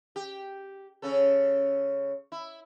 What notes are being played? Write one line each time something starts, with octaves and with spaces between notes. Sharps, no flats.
G4
C#3 C#4 A4
E4